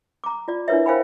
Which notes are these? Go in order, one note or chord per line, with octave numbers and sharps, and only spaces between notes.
A#5 D6
F4 D5
D4 E4 A#4 B4 C#5 E5
A#4 C5 F5 G5 G#5 B5